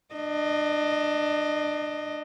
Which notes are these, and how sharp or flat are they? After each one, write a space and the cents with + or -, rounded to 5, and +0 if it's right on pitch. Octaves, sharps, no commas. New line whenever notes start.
D4 +25 D#5 +0